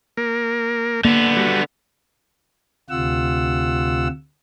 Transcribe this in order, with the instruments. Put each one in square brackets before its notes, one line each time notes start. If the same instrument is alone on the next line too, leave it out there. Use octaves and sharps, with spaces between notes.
[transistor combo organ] A#3 A#4
[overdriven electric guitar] D3 B3 [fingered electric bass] A#3
[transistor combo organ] G3 F#4
[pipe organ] D2 C3 F4 F#5 E6